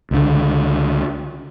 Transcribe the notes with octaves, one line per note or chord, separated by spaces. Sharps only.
C#2 D3